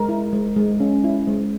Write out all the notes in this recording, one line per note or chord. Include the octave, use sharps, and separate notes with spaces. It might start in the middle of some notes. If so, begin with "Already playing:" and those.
Already playing: G#3 A#4
E4
G#3
G#3
C#4
E4
G#3